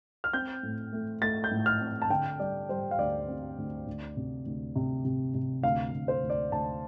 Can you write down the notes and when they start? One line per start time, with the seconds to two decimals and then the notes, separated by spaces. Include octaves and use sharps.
0.24 F6
0.33 C4 G6
0.63 A2
0.93 A3
1.22 A3 A6
1.44 G6
1.51 A2
1.66 F6
1.81 C4
2.02 A5
2.10 D3 G5
2.39 G3 D5
2.69 G3 C5
2.91 F5
2.99 D2 D5
3.28 C4
3.58 D2
3.87 D2
4.17 C3
4.46 D2
4.76 C3
5.05 C3
5.34 C3
5.63 D2 F5
5.93 D2
6.08 C5
6.23 D2
6.30 D5
6.52 D2 A5